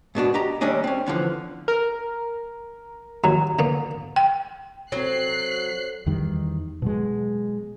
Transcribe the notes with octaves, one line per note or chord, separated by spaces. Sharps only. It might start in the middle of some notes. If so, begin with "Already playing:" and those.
G#2 B2 D4 F#4
G4 D#5 A#5
D#2 G3 A3 C#4 D4 D#5
C4 C#4
E2 D3 E3 F3
A#4
D#2 F#3 A#5
D3 A#3 B3
G5
F#3 C4 A4 C5 C#5 F#6 C7
E2 D#3 G3
B2 F#3 G#3